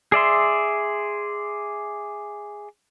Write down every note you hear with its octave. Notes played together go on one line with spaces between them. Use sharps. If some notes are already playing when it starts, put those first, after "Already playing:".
G#4 D5 E5 C6